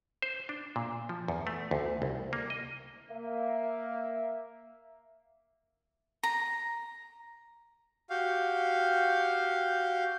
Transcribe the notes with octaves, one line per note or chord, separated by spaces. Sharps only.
C5
D4
A#2
F3
E2
A3
D2
C2
A#3
D#5
A#3 E5
A#5
F#4 G4 F5